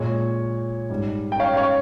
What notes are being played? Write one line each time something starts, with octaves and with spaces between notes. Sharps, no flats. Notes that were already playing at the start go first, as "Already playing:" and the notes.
Already playing: A#2 G#3 C#5
G#2 G3
G5
C#5 F5
C#5 F5